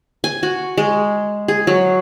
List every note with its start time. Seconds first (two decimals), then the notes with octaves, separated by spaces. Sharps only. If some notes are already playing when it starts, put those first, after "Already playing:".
0.24 G#5
0.43 F#4
0.77 G#3
1.48 G#4
1.67 F#3